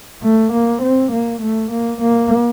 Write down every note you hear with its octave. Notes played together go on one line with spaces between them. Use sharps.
A3
A#3
C4
A#3
A3
A#3
A#3